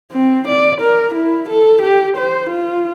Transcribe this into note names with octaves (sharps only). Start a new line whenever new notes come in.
C4
D5
A#4
E4
A4
G4
C5
F4